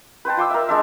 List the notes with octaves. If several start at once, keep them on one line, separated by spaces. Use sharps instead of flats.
B4 C5 G5 A5
F4 C6 D6 E6
A#4 E5
G#3 D4 E5